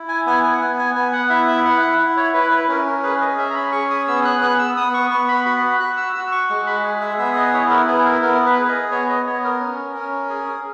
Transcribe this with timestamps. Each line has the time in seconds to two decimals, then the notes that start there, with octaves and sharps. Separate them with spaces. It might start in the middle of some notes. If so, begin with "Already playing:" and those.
Already playing: E4
0.08 G#5
0.26 B3 G#5
0.44 G#5
0.54 F#5
0.61 B3 G#5
0.78 G#5
0.96 B3 G#5
1.13 F#5
1.30 E4 E5
1.48 E5
1.65 E4 F#5
1.82 F#5
1.99 E4
2.17 C#5
2.34 E4 B4
2.52 B4
2.69 C#4 A#4
2.87 A#4
3.03 G#4 B4
3.21 D#5
3.38 C#4 E5
3.50 A#5
3.55 B5
3.72 G#4 C#6
3.90 D#6
4.08 B3 E6
4.25 F#6
4.42 B3 F#6
4.59 E6
4.77 B3 D#6
4.94 C#6
5.11 B3 C#6
5.29 B5
5.46 F#4 B5
5.80 F#4 F#6
5.97 E6
6.15 F#4 E6
6.32 C#6
6.50 G#3 C#6
6.67 B5
6.84 G#4
7.01 E5
7.18 B3 E5
7.37 D#5
7.54 E4 C#5
7.71 A#4
7.88 B3 G#4
8.05 A#4
8.22 B3 A#4
8.46 B4
8.58 G#4
8.68 D#5
8.91 B3 C#5
9.09 D#5
9.26 B3 C#5
9.44 A#4
9.60 C#4
9.95 C#4
10.30 G#4